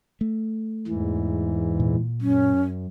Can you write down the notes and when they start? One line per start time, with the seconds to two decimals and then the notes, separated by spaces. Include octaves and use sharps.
0.21 A3
0.88 E2 G#2 E3
1.80 A#2
2.21 F#2 C#4